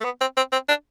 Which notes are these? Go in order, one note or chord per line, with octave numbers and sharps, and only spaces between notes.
A3
B3
C4
C4
C4
D4